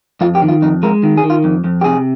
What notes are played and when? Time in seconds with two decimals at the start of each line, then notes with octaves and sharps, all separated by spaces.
0.21 F2 F4
0.35 G4
0.42 D#3
0.48 F4
0.62 F2 D#4
0.83 G#3 A#4
1.03 D#3
1.17 G#4
1.24 D#3
1.30 F4
1.44 F2
1.64 F2
1.81 G4
1.84 C3 G#4